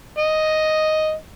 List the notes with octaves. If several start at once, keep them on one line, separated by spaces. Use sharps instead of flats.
D#5